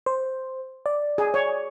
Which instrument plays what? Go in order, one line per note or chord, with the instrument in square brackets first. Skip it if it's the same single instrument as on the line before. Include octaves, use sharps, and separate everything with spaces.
[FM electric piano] C5
D5
[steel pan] G#4
C#5